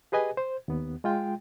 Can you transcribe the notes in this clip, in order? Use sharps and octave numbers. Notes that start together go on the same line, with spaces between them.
G4 G#4 B4 D#5 G#5
C5
D#2 B3
G#3 F4 G5